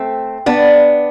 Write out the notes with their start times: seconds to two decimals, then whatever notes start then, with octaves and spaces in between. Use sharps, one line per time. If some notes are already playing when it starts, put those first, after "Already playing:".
Already playing: A3 C4
0.46 B3 D4